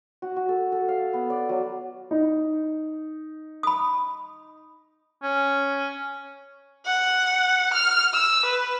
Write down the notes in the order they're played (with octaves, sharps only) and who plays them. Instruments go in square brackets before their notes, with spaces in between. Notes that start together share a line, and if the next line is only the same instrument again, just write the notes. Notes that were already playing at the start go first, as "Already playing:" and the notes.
[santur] F#4
F#4
A4
A4
F5
B3
D5
F#3
[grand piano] D#4
[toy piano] B5 D#6
[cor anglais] C#4
[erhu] F#5
F6
E6
B4